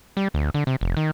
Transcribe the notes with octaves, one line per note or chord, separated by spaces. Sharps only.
G3
D2
D3
C3
F1
D#3